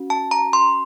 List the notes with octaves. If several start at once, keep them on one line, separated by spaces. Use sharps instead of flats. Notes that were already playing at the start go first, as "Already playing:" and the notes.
Already playing: C#4 F#4
A5
A#5
C6